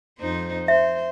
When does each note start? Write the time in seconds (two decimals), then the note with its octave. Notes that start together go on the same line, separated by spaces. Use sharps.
0.19 F2 D#4 C5
0.68 C5 E5